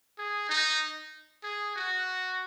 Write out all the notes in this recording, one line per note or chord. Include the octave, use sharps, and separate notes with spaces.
G#4
D#4
G#4
F#4